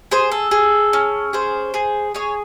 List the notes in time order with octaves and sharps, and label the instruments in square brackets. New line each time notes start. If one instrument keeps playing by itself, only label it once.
[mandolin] G#4 C5
A4
G#4
C#4
G#4 C5
G#4
G#4 C#5